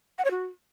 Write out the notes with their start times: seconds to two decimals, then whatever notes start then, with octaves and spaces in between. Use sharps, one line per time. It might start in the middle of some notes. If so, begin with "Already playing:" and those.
0.18 F#5
0.25 C#5
0.31 F#4